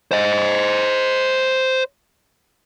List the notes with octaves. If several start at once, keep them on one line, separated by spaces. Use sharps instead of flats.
C5 D#5